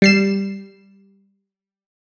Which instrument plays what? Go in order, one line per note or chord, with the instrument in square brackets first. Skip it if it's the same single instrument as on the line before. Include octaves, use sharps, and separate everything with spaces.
[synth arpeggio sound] G3 C7 E7